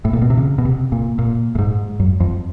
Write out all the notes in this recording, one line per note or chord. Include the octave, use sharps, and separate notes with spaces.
A2
A#2
B2
C3
C#3
B2
C3
A#2
A#2
A2
G#2
F#2
F2